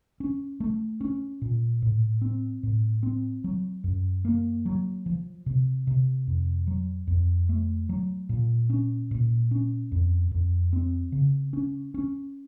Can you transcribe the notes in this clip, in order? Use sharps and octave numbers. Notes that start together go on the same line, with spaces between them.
C#4
A3
C#4
A#2
A2
C4
A2
C4
F#3
F#2
A#3
F#3
F3
C3
C3
F2
F#3
F2
A3
F#3
A#2
C#4
A#2
C#4
F2
F2
C4
C#3
C#4
C#4